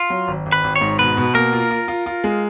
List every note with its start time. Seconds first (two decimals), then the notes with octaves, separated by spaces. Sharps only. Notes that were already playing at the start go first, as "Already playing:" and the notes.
Already playing: F4
0.10 F#3
0.28 G#1
0.46 G#1
0.52 B4
0.64 G#1
0.76 C#5
0.81 G#2
0.99 B2 B4
1.17 B2
1.35 A#3 A#4
1.53 F4
1.71 F4
1.88 F4
2.06 F4
2.24 G#3